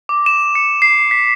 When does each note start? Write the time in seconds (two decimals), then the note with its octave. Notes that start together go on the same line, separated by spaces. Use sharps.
0.09 D6
0.26 E7
0.55 C#7
0.82 C7
1.11 B6